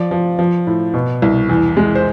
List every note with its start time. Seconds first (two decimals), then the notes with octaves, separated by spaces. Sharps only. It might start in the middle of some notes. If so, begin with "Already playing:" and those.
Already playing: F3 D5
0.11 F3
0.39 F3
0.67 A2
0.94 B2
1.22 C2
1.49 E2
1.77 G#3
1.95 C5